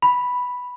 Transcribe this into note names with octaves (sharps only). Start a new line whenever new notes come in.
B5